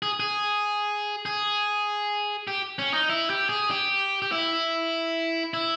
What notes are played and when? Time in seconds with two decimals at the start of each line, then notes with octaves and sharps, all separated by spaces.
0.02 G#4
0.20 G#4
1.25 G#4
2.48 G4
2.79 C#4
2.94 D#4
3.10 E4
3.30 G4
3.49 G#4
3.71 G4
4.22 G4
4.32 E4
5.54 E4